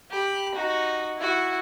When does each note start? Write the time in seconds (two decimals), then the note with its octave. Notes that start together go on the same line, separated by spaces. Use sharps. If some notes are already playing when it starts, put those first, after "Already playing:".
0.11 G4 B5
0.55 D#4 F#4
1.18 E4 F#4